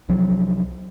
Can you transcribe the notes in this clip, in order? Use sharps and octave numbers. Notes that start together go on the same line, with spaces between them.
C2 F3 F#3